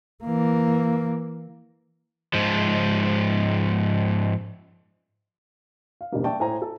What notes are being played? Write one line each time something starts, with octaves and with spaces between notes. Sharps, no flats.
E3 A#3
G#2 F3
F5
E1 G#2 C#3 G3 A#3
D5 E5 G5 A5 C#6
A2 C5 G#5 A#5
A4